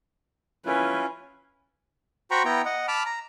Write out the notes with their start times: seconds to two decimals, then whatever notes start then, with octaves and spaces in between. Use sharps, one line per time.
0.66 C#4 E4 F4 B4 G#5
2.31 F#4 C5 G5 A#5 B5 C#6
2.45 B3 E4 G5 A#5
2.65 D#5 F#5
2.88 A5 B5 D6 F6
3.06 A#5